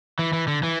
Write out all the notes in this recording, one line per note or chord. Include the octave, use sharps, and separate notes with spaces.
E3
E3
D3
E3